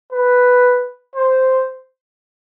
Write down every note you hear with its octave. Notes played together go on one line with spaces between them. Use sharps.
B4
C5